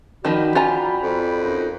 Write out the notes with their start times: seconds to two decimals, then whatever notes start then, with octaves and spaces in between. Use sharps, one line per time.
0.25 D#3 F3 D#4 F#4 D5 G5 B5
0.55 F4 G#5 A#5
1.02 F2
1.43 F#2 D#4